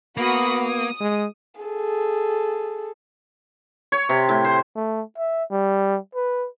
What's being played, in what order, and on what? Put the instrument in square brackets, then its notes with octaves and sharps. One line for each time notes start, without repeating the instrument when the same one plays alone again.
[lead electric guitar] A#3 [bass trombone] B3 [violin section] F#4 B5 D#6
[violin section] D#6
[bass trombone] G#3
[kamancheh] G#4 A4
[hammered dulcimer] C#5
C3
A2
C5
[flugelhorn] A3
E5
G3
B4